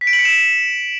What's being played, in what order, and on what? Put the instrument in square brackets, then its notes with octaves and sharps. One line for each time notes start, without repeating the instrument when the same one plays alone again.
[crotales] B6
D7
F#7
C#7
E7